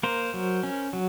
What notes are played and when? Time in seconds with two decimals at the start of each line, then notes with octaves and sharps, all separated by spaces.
0.03 A#3 A#4 C5
0.34 F#3
0.63 C#4
0.93 F#3